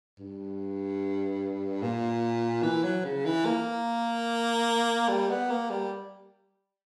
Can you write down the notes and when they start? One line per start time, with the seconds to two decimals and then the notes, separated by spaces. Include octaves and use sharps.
0.18 G2
1.82 A#2
2.63 E3
2.84 F#3
3.05 C#3
3.25 E3
3.46 A#3
5.08 G3
5.30 B3
5.50 A#3
5.70 G3